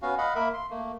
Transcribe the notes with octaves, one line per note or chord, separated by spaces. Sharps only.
B3 C#4 F#4 F5
D#5 F5 F#5 B5
A#3 A#4 E5 B5
C6
A3 A#3